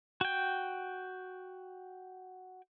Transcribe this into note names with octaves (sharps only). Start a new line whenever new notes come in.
F#4 G5